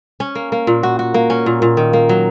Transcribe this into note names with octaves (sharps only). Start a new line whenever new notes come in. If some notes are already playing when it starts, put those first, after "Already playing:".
C#4
A#3
A#3
A#2
F#4
F#4
A#3
C#4
A#2
A#2
D#3
A#3
F#3